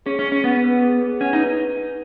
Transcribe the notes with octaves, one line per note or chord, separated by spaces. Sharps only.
C#4 G#4
C#4
G#4
C#4
B3 F#5
B4
G#4
G#4
C#4 F#5
D#4
B4